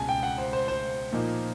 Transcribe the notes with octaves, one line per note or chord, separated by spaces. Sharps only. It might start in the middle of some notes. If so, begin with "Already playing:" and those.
Already playing: C#2 B2 G#3 G#5 A5
G5
F#5
C5
C5
C5
A#2 F3 A#3 D#4